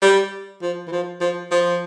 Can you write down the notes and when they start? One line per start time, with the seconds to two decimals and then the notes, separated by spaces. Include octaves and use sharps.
0.02 G3
0.62 F3
0.88 E3
0.92 F3
1.21 F3
1.51 F3